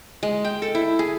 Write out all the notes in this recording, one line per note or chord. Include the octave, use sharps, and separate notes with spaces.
G#3
G5
A4
E4
G#4